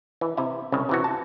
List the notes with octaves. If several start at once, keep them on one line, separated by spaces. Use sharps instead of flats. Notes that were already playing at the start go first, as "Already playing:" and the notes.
E3
C3 E4
C2 C#3
C3 E3 F#4
A5